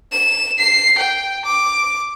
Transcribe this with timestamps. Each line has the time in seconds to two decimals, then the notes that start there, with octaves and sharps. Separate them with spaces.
0.12 E7
0.59 C7
0.98 G5
1.45 D6